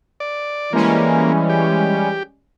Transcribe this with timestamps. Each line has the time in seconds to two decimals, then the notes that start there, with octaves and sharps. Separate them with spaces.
0.20 D5
0.73 E3 G3 G#3 A#3 C#4
1.49 G4